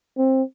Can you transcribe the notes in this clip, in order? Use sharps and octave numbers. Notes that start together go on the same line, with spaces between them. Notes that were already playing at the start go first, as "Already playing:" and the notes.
C4